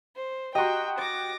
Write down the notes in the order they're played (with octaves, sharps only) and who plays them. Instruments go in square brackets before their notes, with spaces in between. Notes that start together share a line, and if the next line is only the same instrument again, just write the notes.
[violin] C5
[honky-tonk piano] F#4 G4 [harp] D#5 A#5 C6 [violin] G5
[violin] D6 A#6 [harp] A6